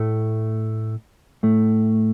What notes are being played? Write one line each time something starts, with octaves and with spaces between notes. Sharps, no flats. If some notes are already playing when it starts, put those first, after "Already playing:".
Already playing: A2 A3
A2 A3